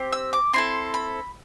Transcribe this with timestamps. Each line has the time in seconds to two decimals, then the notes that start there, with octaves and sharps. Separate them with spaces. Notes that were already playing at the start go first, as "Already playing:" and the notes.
Already playing: C4 G4
0.13 E6
0.33 D6
0.53 C4 E4 A4 C6
0.94 B5